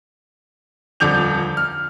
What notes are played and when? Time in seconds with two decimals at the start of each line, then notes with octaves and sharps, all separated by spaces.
1.00 D#1 F2 D3 D6 G6 F7
1.57 F6